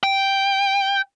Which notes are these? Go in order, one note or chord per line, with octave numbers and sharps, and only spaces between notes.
G5